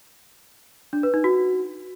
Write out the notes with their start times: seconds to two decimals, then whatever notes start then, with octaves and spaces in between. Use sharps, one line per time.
0.93 D4
1.03 B4
1.14 D#4
1.24 F#4